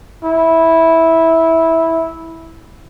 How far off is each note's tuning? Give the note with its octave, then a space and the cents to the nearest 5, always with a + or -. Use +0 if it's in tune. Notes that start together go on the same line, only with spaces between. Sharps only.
E4 -10